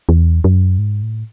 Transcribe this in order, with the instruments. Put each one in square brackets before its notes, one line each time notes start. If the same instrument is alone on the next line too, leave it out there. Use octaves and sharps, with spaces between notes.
[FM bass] E2
F#2
G#2
A2